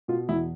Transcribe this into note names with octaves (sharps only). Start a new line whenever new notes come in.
B2 F4
E2 E4